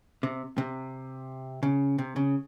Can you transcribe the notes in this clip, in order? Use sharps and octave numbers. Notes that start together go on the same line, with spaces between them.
C3
C3
C#3
C3
C#3